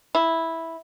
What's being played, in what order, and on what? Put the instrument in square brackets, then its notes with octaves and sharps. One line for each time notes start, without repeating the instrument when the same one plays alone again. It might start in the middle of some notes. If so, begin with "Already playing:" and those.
[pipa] E4